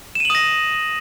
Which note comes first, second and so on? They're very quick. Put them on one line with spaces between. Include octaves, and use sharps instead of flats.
E7 D#7 F#7 D#6 A#6